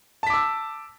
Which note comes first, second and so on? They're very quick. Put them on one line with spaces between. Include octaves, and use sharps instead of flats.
A5 B6 D6 E6